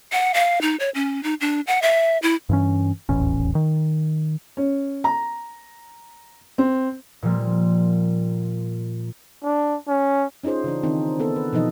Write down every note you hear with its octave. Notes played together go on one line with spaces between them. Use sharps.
F#5
F5
D#4
C#5
C#4
D#4
D4
F#5
E5
E4
G2 E3 C#4
D#1 A1 E2 C#4
D#3
C#4
A#5
C4
A#2 F3 G3 A#3
D4
C#4
C#4 D#4 F4 G#4 C5
C#3 E3 D4
D#3 C4 D#4
B3 A4
B4
B2 E3 F3 D#4 D#5